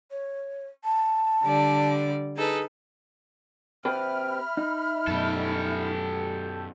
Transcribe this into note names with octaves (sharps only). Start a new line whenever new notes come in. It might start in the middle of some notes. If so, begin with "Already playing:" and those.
C#5
A5
D3 G3 D5
D#4 G#4 A4 B4
C4 G4 B4 E5 B5 F6
D#4
F#2 B2 G4 A4